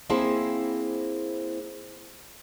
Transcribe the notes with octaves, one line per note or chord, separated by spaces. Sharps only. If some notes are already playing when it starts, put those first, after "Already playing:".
A#3 C4 E4 G#4 C5 A5